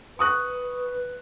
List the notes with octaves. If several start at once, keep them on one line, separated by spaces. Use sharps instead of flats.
B4 C#6 D#6 F#6